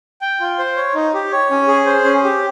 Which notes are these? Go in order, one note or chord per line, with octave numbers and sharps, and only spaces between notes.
G5
F4
C5
C#5
D#4
G4
C#5
C#4
G#4
C5
C#4
G4